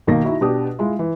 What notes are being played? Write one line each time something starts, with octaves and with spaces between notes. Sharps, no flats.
B1 D#3 A#3 A#6
D#4 E4 F#4
B2 D4 G4 D#6
G#3 E4 F4
E3